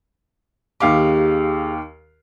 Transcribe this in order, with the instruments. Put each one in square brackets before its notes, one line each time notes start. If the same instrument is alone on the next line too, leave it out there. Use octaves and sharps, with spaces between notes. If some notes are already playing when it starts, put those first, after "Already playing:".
[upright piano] D#2 F5 D6 [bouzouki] G4 G#4